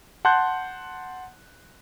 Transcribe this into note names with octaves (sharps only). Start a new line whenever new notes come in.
F#5 A5 C6 F#6 G6